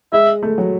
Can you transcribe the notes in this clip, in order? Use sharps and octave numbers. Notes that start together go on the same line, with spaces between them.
G#3 E5
A3
F#3